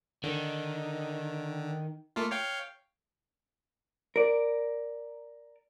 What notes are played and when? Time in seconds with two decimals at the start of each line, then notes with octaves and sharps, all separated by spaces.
0.24 D3 D#3
2.16 A3 A#3 F4
2.31 C#5 F5 G5
4.16 A#4 D5